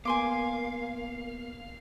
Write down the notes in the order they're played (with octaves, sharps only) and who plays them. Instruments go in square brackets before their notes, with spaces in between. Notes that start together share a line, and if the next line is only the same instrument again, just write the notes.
[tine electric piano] A#3 B3 [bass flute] A#4 [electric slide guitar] F5 [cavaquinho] G#5 C6 D6